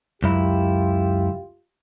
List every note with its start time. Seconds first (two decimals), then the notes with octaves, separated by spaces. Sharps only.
0.23 C#2 F#2 E4 F4 G4